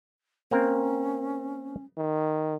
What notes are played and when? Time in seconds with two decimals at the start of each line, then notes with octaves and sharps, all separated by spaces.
0.51 A#3 C4 C#4 A#4
1.98 D#3